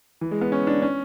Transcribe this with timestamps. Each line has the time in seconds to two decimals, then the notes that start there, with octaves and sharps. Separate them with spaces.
0.21 E3
0.31 G#3
0.42 B3
0.52 C#4
0.67 D4
0.82 C#4